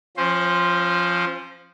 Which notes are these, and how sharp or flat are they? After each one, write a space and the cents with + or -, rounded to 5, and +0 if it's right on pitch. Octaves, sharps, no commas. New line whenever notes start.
F3 +0 C#4 -35 C5 +0